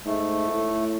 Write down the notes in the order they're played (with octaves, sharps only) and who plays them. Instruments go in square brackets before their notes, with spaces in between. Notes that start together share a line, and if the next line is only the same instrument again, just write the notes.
[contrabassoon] G#2 [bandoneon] A3
[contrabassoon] A2